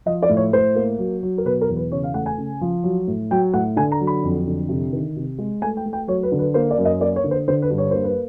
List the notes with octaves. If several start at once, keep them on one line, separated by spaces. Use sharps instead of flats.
F3 D#5
D5
A2
C#5
A2 C5
A#3
F#3
F#3
A#4
B2 B4
A#4
E2
B4
C#3 C#5
F5
A3 F#5
G#5
C#3
F3
F#3
A2
F#3 G5
A2 F#5
D3 G#5
A#5
F#3
B5
F2
D3
C3
D#3
C3
G#3
A3 G#5
G5
A3
G5
F#3 C#5
B4
D3
B4
A#3 C5
D5
F#2
D#5
A#3 D5
C#5
D3
C5
D3 C5
B4
G2
C#5
A#3 C5
B4